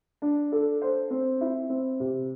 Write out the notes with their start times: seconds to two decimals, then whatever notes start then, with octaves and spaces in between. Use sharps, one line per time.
0.22 D4
0.52 A4
0.82 C5
1.10 C4
1.41 E4
1.70 C4
2.00 C3